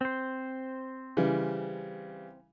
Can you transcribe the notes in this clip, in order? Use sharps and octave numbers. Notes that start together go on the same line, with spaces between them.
C4 C5
C#3 E3 G3